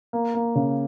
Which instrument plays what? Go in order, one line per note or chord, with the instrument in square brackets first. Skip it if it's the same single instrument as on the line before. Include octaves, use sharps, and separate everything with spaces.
[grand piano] A#3
A#3
C#3